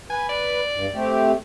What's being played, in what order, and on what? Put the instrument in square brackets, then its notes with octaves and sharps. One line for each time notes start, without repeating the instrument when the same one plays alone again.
[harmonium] B4 [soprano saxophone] G#5
[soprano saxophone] D5
[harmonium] G2
A3 C4 G4